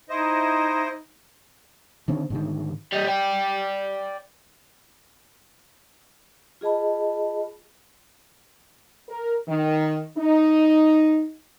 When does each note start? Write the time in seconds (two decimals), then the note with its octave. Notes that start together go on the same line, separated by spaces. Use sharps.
0.09 D#4 E4 C5 D#5
2.08 D3 D#3 C4
2.30 G#2 D3 D#3
2.93 G3 D#5
3.08 D5 G5
6.61 F4 G#4 D#5 A5 B5
9.09 A#4
9.48 D#3
10.18 D#4